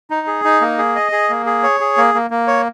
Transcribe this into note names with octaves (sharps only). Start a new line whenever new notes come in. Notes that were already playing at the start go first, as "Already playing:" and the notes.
D#4
G#4
D#4
A#3
G#4
D#5
G#4
A#3
G#4
C#5
G#4
A#3
A#3
A#3
C#5